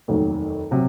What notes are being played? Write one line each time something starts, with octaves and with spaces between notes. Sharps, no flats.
F1 D#2 D#3 F#3
C3 F#3